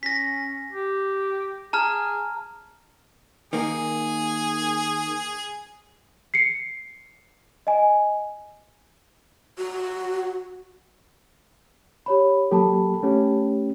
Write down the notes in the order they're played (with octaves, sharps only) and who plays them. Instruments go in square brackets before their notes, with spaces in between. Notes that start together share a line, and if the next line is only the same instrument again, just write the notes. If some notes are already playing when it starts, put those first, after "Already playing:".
[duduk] C#4 [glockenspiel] A#6 B6
[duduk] G4
[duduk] G#4 [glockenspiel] A5 A#5 F6
[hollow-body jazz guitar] D#3 A#3 [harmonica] G#4
[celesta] C7 C#7
D#5 G#5
[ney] F#4
[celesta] G4 C#5 B5
[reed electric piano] F#3 A#3 G4 [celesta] A4 A5 B5
[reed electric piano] A3 C#4 G4